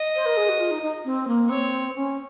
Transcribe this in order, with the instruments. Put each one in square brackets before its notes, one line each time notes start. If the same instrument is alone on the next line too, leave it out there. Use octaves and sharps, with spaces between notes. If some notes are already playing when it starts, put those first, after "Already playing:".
Already playing: [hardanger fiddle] D#5
[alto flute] C5
A#4
G#4
F#4
F4
D#4
D#4
C4
A#3
[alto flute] C4 [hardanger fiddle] C#5
[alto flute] C#4